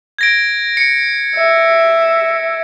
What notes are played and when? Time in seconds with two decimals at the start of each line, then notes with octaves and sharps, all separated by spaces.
0.18 G#6 A#6 D7
0.77 C#7
1.35 E5